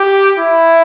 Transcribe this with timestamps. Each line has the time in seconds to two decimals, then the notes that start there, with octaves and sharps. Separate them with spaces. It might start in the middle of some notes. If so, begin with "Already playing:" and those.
Already playing: G4
0.38 E4